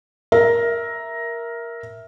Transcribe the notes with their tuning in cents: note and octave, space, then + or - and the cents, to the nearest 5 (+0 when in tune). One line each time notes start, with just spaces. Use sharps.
A#4 +5 E5 +0